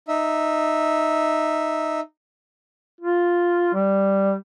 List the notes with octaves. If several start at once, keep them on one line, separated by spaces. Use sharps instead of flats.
D#4 E5
F4
G3